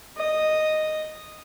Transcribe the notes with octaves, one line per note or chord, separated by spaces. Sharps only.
D#5